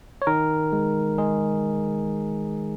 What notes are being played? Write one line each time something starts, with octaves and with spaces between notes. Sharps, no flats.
C#5
D#3 A#4
G#3
G#3 G#4